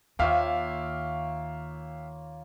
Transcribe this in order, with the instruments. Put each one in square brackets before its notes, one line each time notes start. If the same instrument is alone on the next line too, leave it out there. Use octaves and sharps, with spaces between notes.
[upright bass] D#2 [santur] A#3 F4 C#5 [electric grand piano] E5 F5 G5